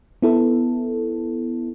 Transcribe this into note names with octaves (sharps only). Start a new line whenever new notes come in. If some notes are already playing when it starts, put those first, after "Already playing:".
B3 E4 A4